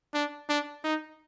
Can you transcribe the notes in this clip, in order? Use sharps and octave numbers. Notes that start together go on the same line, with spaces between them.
D4
D4
D#4